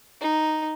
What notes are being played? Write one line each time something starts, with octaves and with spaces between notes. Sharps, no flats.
D#4